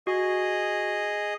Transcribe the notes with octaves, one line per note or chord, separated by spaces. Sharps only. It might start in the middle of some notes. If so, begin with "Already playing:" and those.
F#4 G#4 D#5